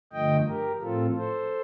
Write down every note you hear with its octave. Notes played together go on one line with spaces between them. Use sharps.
G2 D3 F3 A3 D#5 G5
G4 A#4
A2 F3 C4 F4 A4
A4 C5